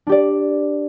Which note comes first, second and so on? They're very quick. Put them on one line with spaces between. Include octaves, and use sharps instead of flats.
D4 G4 D5